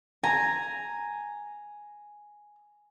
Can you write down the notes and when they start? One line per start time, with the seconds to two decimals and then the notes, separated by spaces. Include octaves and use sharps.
0.23 G#5 A#5